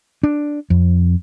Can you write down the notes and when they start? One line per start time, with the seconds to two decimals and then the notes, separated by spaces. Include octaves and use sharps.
0.23 D4
0.70 F2